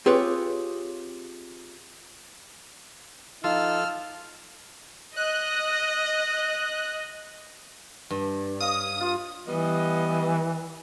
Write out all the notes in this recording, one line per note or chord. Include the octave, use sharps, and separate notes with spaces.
C4 F4 G4 G#4 B4 C#5
F3 D#4 F4 A4 E6 F6
D#5 F#6
G2
C#5 D#5 F5 D#6
F4
E3 G3 B3 D#5